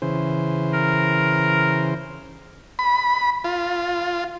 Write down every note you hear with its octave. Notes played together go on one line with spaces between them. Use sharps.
C#3 E3 C5
A#4
B5
F4